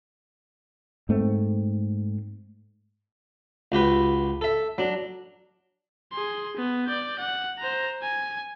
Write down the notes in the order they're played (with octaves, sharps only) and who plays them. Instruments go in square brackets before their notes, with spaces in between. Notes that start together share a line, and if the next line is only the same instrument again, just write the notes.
[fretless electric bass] G#2 A3 C4
[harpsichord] C#2 F#4 G4 B4
A4 E5
F#3 D4
[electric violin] G#4 C6
B3
D5 G6
F#5
C5 A#5
G#5